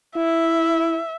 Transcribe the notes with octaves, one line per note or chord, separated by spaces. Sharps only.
E4 E5